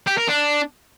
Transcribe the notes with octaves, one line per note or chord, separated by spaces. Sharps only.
G4
A#4
D4